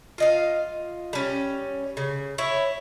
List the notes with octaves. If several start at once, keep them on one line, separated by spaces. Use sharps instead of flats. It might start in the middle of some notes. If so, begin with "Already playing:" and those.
F4 D#5 F5
G3 C#4
C#3
E4 C#5